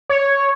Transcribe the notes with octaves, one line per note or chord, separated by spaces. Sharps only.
C#5